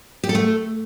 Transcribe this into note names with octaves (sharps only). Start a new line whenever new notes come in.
G4
A4
A3